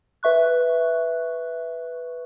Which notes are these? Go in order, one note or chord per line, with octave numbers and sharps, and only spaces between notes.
B4 E5 C#6 F#6